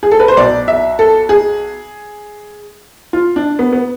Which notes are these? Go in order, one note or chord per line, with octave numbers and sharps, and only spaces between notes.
G#4
A4
B4
C5
B1 B2 D5
E5
A4
G#4
F4
D4
B3
B3